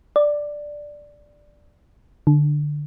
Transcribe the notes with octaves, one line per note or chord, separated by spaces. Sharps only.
D5
D3